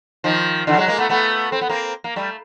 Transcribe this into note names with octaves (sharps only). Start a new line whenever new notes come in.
D#3 F3
D3 E3
F#3 G#3
G#3 A#3
A3 B3
A3 B3
C4
B3
A#3 C4
A#3
G3 A3